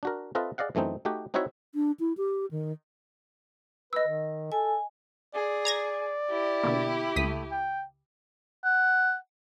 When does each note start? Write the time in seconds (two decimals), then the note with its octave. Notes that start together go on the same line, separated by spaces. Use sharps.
0.03 D4 F#4 A#4
0.35 C4 F4 A4 B4 D#5 E5
0.58 G#4 D5 D#5 F5 F#5
0.75 F#2 E3 A3 C4 D#4
1.05 A3 D#4 F#4 G4
1.34 C4 D#4 E4 F#4 C#5 E5
1.74 D4
2.00 E4
2.17 G4
2.51 D#3
3.93 B4 D#5 E6
4.08 D#3
4.52 A4 G#5
5.35 G#4 D5
5.65 A#5 G#6 A#6
6.30 E4 G4
6.64 B2 D3 A#3
7.16 C#2 A3 D#6 B6
7.51 G5
8.65 F#5